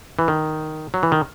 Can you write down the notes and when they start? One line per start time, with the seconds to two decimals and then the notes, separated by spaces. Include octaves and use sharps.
0.19 E3
0.28 D#3
0.94 F#3
1.03 E3
1.12 D#3